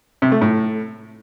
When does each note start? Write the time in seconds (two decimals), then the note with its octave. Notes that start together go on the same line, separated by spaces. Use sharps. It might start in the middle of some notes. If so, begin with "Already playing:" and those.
0.22 C3
0.32 A3
0.41 A2